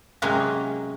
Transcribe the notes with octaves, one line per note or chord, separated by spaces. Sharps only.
C3 F#3 G#3 A#3 C#4